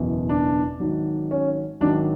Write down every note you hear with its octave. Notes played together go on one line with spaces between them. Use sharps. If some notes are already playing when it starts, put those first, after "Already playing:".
Already playing: F#1 E2 B2
D4
G#1 G#2 F#3
C#4
G#1 G#2 F#3 D4